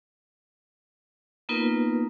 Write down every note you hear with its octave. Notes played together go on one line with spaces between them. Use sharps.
A#3 B3 D#4 F4 A#4 B4